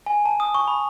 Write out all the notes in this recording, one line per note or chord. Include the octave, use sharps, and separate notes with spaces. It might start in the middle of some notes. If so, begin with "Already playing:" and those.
G#5
A5
D#6
C#6
B5